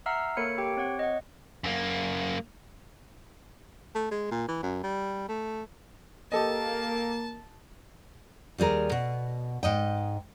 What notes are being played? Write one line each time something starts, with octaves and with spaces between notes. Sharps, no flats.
E5 F#5 A#5 E6 F6 C7
A#3 A4 A#4 C#5 B5 C#7
G4 G5
C4 C#5 F#5
D#5 F#5
F#2 A#3
A3
G#3
A#2
E3
F#2
G3
A3
A#3 G4 A4 D#5 A5
D#2 G3 G#4 A#4
B2
G#2 D#5 G5